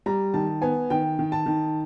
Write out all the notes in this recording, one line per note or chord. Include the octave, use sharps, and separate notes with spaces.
G3 A#5
D#3 A5
B3 G#5
D#3 G5
D#3
A5
D#3